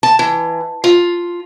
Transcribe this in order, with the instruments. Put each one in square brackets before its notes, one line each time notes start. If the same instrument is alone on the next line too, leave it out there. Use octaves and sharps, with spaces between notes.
[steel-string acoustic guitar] A5
E3
F4